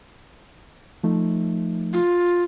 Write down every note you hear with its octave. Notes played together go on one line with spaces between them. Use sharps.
F3 A3 D#4
F4